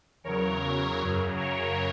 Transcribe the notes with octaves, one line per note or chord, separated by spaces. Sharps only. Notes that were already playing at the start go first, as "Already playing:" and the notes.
E2 C#3 F#3 A#4 C#5
F#2 C#3 F#3
A#4 C#5